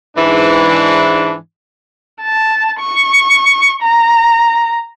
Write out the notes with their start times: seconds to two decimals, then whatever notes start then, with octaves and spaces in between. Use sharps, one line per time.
0.17 G#2 E3 D4
2.21 A5
2.79 C#6
3.82 A#5